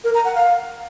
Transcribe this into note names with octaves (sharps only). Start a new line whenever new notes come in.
A#4
A#5
F#5
F5